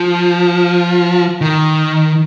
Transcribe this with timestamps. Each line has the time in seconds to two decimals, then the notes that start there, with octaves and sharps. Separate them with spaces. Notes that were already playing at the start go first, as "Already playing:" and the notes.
Already playing: F3
1.41 D#3